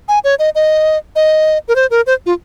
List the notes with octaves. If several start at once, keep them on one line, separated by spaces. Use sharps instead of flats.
G#5
C#5
D#5
D#5
D#5
A#4
C5
A#4
C5
F4